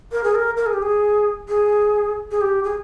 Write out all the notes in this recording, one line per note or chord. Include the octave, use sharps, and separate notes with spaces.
A#4
G#4
A#4
A#4
G#4
G4
G#4
G#4
G#4
G4
G#4